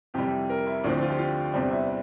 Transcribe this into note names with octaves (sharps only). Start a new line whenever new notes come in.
F2 C3 E3 G3 G4
A#4
E4
D2 D3 F3 A3 C4 D4
F4
G4
F4
E2 C3 G3 C4 D4
E4